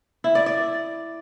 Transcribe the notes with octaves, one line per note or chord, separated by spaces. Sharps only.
E4
D5
D5